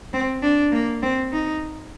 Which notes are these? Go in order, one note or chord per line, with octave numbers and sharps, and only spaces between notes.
C4
D4
A#3
C4
D#4